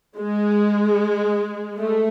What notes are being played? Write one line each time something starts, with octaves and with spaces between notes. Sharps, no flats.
G#3
A3